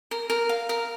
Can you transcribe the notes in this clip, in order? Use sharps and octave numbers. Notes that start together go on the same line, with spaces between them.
A#4
A#4
F5
A#4